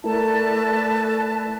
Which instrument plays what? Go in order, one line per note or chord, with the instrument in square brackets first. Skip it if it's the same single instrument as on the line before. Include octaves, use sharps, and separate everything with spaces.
[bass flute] A3 [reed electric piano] E4 A#4 [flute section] B4 D5 A5